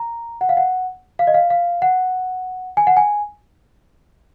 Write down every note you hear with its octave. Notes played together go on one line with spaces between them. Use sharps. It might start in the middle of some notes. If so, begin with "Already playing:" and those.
Already playing: A#5
F#5
F5
F#5
F5
D#5
F5
F5
F#5
G#5
F#5
G#5